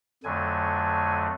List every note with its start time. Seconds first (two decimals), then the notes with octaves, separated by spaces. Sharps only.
0.24 F2 D3 F#3 A3 G#5